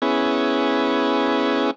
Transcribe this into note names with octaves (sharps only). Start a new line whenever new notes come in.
B3 C#4 E4 G#4